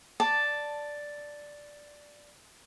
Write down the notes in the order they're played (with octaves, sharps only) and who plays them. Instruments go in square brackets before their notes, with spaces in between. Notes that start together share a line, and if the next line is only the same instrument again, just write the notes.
[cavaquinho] D5 A5